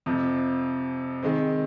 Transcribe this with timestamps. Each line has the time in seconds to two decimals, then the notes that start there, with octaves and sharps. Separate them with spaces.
0.06 F2 C3 F3
1.23 D#3 G#3 C4